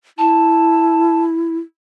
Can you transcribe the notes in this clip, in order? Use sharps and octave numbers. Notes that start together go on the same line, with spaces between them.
E4 A5